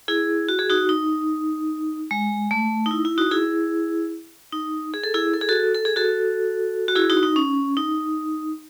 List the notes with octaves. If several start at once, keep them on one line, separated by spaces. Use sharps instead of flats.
E4 G#4
F#4
G#4
D#4 F#4
D#4
G#3
A3
D#4
E4
E4
D#4 F#4
E4 G#4
D#4
G#4
A4
E4 G#4
A4
G#4
F#4 A4
A4
G#4
F#4 A4
F#4
E4 G#4
D#4 F#4
D#4
C#4
D#4